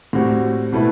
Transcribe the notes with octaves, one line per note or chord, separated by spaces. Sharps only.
A2 G3 C4 F#4
B2 A3 E4 B4